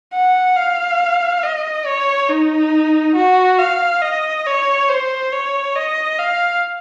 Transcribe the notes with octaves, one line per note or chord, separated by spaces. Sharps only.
F#5
F5
D#5
C#5
D#4
F#4
F5
D#5
C#5
C5
C#5
D#5
F5